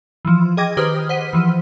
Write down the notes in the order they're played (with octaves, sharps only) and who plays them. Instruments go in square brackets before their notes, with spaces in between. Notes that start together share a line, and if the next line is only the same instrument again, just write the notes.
[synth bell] E3 F3
G#4 D#5 G5 D6 G#6 A#6
D#3 G4 B4 C5 D#6 F6
C5 F#5 B6 D#7
E3 F3